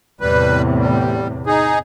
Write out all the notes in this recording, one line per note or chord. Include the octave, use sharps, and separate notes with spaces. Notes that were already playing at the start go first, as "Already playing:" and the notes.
E2 A2 C3 G3 B4
G3
D#4 G#4